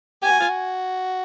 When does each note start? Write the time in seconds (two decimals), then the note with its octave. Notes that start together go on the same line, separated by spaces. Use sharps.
0.23 G4 G#5
0.31 F#4
0.40 F4
0.49 F#4